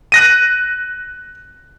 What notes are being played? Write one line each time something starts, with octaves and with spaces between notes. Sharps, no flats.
F#6 A#6 D#7